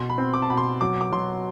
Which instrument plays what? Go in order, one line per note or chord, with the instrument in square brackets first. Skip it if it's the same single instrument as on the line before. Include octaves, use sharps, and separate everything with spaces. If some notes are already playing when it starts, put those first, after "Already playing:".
Already playing: [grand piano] B2 [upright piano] C6
[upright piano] B5
[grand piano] C4
[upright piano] D6
A5
[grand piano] B2 [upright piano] B5
[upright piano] C6
[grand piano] F#3 [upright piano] D6
[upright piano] D6
[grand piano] F#3 [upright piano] C6